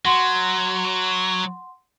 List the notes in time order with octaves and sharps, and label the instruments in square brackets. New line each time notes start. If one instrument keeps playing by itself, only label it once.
[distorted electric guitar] F#3 [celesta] F#5 C6